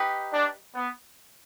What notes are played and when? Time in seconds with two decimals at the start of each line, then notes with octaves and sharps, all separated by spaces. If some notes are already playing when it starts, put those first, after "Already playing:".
Already playing: D#4 G4 B4
0.32 D4
0.75 B3